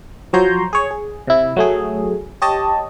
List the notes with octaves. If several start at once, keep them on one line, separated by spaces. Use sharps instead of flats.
F3 F#3 C#5 A#5 C6 G6
G#4 C#5
G#4
C3 E4
F#3 A3 G#4
G4 C#5 D#5 A5